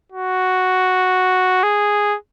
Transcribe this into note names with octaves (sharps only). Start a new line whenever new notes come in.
F#4
G#4